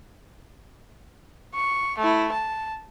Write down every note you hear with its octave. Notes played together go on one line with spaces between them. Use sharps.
C#6
A3 E4
A5